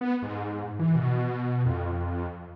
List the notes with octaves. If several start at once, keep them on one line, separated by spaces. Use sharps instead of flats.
B3
G#2
E3
B2
F2